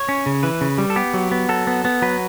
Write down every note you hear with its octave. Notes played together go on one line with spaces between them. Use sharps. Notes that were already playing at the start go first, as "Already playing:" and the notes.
Already playing: C#5
C#4
C#3
E3 B4
C#3
G3
A4
B3 G4
F#3
B3
F#3 A4
B3
B3
F#3 B4